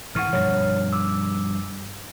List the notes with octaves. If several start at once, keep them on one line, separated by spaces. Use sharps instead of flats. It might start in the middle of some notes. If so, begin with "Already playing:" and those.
G#2 E3 F#5 C#6 F6
G2 B2 F3 C#5 F6
D6 E6